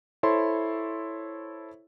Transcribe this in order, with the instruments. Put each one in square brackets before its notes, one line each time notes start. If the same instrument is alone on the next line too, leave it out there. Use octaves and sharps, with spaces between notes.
[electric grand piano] E4 A4 C5 C#5 C6